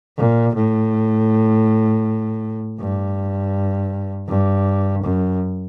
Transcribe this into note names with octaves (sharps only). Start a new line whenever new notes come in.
A#2
A2
G2
G2
F#2